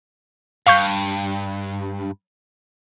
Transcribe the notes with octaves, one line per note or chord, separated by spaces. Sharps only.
G2 F5 C#6 G6